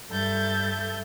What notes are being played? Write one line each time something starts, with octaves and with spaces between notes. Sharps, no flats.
G2 A4 E5 G6 A6